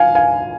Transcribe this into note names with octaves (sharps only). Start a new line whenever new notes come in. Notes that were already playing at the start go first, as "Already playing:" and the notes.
Already playing: F5 G#5
F5 G#5